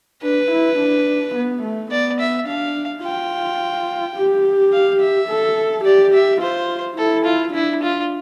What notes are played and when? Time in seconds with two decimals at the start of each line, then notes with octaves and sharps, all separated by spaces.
0.23 D4 B4
0.51 E4
0.79 D4
1.35 B3
1.63 A3
1.91 B3 D5
2.20 E5
2.48 D4 F5
3.03 F4 G5
4.16 G4
4.73 F5
5.01 E5
5.29 A4
5.85 G4 D5
6.14 E5
6.41 F4 C5
6.98 E4 A4
7.25 F4
7.54 D4 E4
7.82 F4